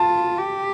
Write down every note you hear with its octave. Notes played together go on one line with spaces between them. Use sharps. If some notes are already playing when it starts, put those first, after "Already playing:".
Already playing: F4 A5
G4